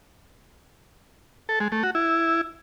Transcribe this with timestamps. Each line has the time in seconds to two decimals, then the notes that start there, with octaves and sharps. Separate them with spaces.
1.49 A4
1.60 G#3
1.72 A3
1.83 F#4
1.95 E4